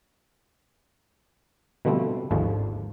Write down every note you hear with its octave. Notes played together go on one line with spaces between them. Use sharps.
B2 D3 F3 G3 A3 C4
G#1 D#2 G#2 D3 F3